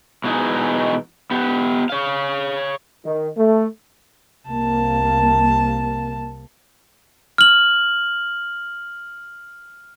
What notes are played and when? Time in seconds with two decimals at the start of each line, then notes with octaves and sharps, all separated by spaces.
0.24 B2 E3 G#3 D#4
1.31 B3 G4
1.90 C#5 F5
3.04 D#3
3.37 A3
4.48 C2 C3 A#3 A5
7.38 F6 F#7